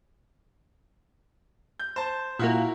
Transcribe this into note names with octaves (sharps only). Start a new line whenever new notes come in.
G6
C5 A5
A#2 A#3 E4 F#4 A#4